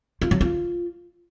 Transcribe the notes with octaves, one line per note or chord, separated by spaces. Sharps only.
F4
F#3
F4